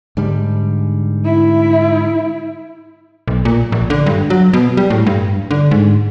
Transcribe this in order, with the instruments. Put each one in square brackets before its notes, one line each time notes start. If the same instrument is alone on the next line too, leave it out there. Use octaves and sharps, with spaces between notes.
[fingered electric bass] G#2 D3 G3
[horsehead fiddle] E4
[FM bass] B1
A#2
A#1
D3
G2
F#3
B2
G3
A2
G2
D3
G#2